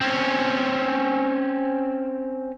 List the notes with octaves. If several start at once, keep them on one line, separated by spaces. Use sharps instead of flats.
C4 C#4